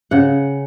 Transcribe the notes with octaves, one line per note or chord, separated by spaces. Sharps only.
C#3 F#5